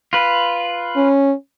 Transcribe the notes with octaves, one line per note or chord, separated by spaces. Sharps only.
F4 B4
C#4